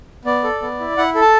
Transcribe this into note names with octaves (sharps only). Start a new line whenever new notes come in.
B3 D5
A4
B3
E4
E4 F#5
A4
A5